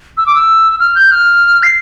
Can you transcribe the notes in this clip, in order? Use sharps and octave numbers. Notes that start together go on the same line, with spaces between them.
E6
D6
E6
F6
G6
F6
C7